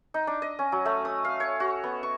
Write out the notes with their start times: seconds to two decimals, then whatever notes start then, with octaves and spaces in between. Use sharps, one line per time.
0.14 D#4
0.27 D4
0.42 D#5
0.59 C#4
0.72 F#3
0.85 A3
1.05 D#6
1.25 F5
1.40 C#5
1.60 F#4
1.84 B3
2.03 C#6